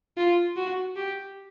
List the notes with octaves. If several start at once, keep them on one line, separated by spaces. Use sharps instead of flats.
F4
F#4
G4